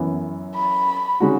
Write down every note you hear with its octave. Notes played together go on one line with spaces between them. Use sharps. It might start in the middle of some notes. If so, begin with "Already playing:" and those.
Already playing: F#2 E3 B3
B5
C#3 G#3 D#4 F#4